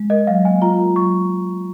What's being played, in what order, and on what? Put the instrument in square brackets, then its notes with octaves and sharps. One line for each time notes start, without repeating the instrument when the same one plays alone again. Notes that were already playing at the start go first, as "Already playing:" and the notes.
Already playing: [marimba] G#3
[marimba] A#4 [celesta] D#5
[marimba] F#3 [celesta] F5
[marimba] A#3 [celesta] G#5
[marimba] F4 [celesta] A#5
[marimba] A#4 [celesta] A#5
[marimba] F#3 [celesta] C#6